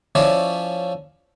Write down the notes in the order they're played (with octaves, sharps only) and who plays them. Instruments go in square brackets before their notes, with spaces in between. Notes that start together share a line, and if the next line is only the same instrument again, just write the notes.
[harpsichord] F3 C#4 E4 C#5 D5 E5